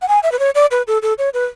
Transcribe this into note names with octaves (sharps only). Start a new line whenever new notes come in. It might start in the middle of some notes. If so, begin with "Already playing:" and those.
F#5
G#5
E5
B4
C#5
D5
B4
A4
A4
C#5
B4